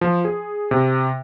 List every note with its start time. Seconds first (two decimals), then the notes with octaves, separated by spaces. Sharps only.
0.01 F3
0.25 G#4
0.71 C3